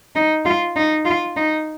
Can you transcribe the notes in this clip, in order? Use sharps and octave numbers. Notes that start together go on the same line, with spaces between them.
D#4
F4
D#4
F4
D#4